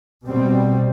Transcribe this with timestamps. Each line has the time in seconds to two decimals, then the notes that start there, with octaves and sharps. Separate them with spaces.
0.25 B2 G3 C4